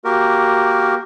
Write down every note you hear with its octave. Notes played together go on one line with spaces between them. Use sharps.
A#3 F#4 G4 A#4